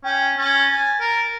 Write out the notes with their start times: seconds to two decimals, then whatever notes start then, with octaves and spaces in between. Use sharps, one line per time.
0.04 C#4 G5
0.38 C#4 A6
0.71 G#5
1.00 A#4